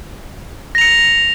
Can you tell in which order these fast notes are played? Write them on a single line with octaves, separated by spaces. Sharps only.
A#6 F7 C#7